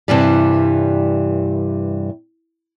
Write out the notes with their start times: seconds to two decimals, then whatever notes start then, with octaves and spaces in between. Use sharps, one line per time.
0.08 G2 C3 E3 G3